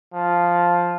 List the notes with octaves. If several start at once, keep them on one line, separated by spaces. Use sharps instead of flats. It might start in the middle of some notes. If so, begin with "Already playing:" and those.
F3